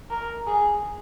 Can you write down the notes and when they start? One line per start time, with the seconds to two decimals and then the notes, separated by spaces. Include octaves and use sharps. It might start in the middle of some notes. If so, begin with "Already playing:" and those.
0.10 A#4
0.47 G#4